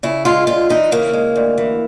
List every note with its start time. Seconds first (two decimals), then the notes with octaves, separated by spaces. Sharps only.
0.03 C#3 E4
0.25 G#3 F4
0.47 D2 F4
0.70 E3 D#4
0.91 C#3 A#3
1.13 G#3
1.36 D2
1.58 E3